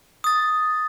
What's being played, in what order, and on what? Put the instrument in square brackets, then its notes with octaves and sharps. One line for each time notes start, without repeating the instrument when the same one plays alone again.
[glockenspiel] D#6 A6